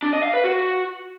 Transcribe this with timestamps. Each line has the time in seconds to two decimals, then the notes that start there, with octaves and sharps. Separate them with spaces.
0.03 D4
0.13 D#5
0.23 F5
0.33 B4
0.44 F#4